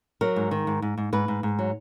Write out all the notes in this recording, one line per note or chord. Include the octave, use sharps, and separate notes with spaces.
F#3 A#4
G#2
D#3
G#2
G#2
G#2
G#2 B4
G#2
G#2
F#3